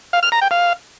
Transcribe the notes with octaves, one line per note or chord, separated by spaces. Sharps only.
F5
F6
A#5
G5
F5